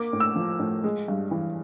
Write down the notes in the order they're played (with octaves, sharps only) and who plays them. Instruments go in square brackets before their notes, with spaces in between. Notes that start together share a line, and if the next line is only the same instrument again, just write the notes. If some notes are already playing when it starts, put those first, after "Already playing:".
Already playing: [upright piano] A#3 D6
A2
E6
F3
A2
G#3
G2
E3